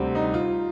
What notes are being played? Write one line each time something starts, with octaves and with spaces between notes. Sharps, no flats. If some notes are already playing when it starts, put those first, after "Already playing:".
Already playing: D2 C3 G3 C4
D#4
F4